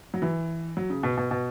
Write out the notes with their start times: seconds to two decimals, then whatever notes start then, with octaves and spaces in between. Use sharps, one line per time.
0.14 F#3
0.22 E3
0.77 F#3
0.90 C#3
1.03 B2
1.17 B2
1.31 B2